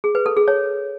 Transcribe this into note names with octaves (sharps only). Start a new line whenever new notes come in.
G#4
B4
A4
G#4
C#5